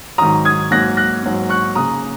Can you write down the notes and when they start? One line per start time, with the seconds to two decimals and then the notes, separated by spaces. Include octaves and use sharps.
0.18 G#2 D#3 F#3 A#5 D#6
0.45 D#6 G#6
0.71 G#2 F#3 A#3 F#6 A#6
0.97 F#6 A#6
1.23 G#2 F#3 A#3
1.49 C#6 F#6
1.75 C#3 A#3 A#5 D#6